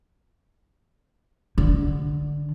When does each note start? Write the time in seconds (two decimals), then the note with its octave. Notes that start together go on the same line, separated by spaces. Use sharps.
1.58 D3